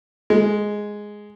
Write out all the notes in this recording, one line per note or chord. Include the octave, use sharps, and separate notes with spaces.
G#3